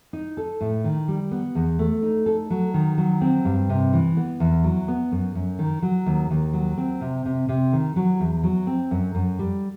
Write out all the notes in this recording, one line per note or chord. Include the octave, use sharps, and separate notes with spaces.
D#4
A4
A2
D#3
G3
B3
E2
A3
D#4
A4
F#3
D#3
F#3
C4
G2
C3
E3
B3
E2
F#3
B3
F#2
F#2
D#3
F#3
D#2
D#2
F#3
C4
C3
C3
C3
D#3
F#3
E2
F#3
C4
F#2
F#2
G3